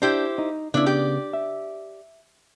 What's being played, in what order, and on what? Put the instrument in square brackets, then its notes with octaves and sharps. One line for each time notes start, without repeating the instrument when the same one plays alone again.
[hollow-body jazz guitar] D4 [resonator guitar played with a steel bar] E4 G4 C5
[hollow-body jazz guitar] D#4
[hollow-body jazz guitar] C#3 B3 [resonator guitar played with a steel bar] D4 E4
[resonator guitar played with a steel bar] G4 D5
[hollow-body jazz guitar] E5